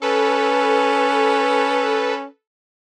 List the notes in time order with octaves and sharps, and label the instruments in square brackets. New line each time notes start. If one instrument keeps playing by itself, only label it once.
[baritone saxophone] C#4 [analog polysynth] A4 B4